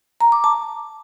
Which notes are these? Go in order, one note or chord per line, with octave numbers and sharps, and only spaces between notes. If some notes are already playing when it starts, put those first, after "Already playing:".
A#5
D6
A5